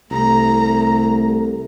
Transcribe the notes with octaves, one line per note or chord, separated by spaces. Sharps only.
C2 A3 A#5